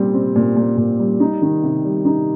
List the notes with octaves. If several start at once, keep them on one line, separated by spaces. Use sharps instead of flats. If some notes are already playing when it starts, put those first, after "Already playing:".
Already playing: A#2 G3 C4
C4
A#2
A#2
A#2
G3
D#4
D#3
C3
G3
D#4